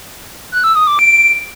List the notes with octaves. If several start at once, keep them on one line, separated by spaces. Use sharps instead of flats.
F#6
E6
D#6
D6
D7